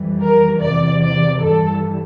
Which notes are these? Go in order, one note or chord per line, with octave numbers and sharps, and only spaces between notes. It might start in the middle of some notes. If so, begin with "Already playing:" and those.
Already playing: F2 E3 G3
A#4
E2 C3 E3 D5
D5
G2 E3 G3 A4